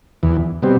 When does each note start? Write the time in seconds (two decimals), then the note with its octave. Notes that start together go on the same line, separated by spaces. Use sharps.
0.23 E2
0.62 B2 G3 C4